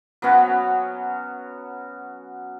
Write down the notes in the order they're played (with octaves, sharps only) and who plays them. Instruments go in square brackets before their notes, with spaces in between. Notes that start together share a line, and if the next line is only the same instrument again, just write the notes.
[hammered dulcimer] F#3 B3 C#4 F#4